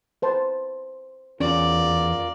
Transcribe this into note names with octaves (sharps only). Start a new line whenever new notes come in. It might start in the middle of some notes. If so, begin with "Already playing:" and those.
B4 C5 A5
E2 C#4 F4 A#4 D5